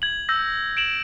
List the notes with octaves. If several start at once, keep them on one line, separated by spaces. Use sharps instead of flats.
G#6 F#7
E6 G6 A#6
D7 E7 F#7